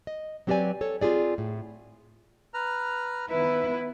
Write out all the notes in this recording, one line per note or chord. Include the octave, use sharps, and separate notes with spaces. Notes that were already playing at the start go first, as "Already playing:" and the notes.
D#5
F#3 C4 G4 B4 D5 G#5
A4 C#5
C4 F4 G4 G#4 D5
A2
B4 A#5 F6
D#3 B3 E4 B4 E5